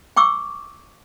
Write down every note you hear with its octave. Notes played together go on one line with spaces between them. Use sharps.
G5 C#6 D6 E6